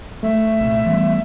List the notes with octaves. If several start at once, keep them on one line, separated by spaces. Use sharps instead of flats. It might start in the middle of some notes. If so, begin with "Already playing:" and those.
A3 E5
C2 A#2
E3 G3 B3